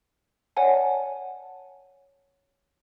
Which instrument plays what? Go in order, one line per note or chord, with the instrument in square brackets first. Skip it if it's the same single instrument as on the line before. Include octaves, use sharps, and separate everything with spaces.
[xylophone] C#5 D5 F#5 G#5 A5